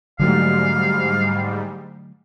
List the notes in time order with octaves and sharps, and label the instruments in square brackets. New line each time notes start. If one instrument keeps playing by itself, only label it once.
[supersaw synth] G#2 G3 [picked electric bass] D3 F#3 A3 [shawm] F5